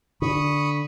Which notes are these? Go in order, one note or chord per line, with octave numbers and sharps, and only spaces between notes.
D3 B5 C#6 D#6